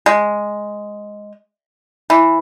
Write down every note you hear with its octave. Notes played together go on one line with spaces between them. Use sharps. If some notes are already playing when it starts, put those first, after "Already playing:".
G#3
E3